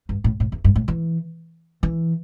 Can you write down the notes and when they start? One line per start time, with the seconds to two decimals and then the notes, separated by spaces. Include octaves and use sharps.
0.09 G2
0.24 A2
0.40 A2
0.52 E2
0.64 G2
0.76 A2
0.88 E3
1.83 E3